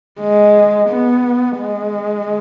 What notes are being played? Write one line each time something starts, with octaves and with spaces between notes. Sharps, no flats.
G#3
B3
G#3